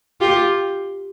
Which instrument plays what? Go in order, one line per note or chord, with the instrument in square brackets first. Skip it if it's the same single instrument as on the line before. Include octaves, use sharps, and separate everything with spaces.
[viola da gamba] F4 G4